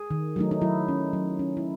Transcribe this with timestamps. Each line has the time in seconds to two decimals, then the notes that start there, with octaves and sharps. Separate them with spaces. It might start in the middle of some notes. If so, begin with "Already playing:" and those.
Already playing: G#4
0.11 D#3
0.36 F#3 A3 D#4
0.51 D#4
0.61 F#3 E4
0.88 C#4
1.13 F#3
1.39 C#4
1.57 E4